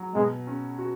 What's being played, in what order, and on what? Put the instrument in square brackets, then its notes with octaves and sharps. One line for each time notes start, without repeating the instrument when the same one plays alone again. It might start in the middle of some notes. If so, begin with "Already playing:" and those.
Already playing: [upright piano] F#3
[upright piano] B2 [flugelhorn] G#3
[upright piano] C#4
F#4